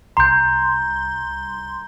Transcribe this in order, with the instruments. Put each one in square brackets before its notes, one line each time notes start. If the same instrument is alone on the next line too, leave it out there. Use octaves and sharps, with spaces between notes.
[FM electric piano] C2 C6 [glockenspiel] A#5 G6